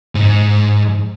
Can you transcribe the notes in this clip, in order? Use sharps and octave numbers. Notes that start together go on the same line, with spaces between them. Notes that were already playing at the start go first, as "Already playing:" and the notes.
G#2